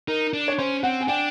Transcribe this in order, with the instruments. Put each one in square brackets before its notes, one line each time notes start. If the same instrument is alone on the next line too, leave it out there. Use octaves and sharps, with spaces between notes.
[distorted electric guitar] D#4 [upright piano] A#4
[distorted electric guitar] D4
[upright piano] C#5
[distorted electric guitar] C#4 [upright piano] C5
[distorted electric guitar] C4 [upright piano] F#5
[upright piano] G#5
[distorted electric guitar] D4 [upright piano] G5